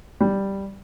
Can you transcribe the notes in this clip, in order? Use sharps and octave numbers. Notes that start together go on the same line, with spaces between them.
G3